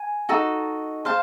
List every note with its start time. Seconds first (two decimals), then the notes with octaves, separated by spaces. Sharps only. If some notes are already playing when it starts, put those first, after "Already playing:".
Already playing: G#5
0.29 D#4 F#4 A4
1.05 C5 F5 A5